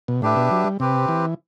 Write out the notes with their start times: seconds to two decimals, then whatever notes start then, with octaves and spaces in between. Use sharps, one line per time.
0.08 B2
0.22 A2 D4 G4 B4 E5
0.36 B2
0.51 F#3
0.65 G3
0.80 C3 C4 G4 B4
1.09 E3